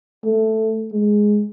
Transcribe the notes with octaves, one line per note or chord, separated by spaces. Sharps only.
A3
G#3